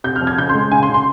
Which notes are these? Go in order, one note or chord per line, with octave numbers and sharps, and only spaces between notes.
C3 G6
F6
F2
G#6
C#3 G6
C6
G#3
C#3 G#5
C6
C#3
C6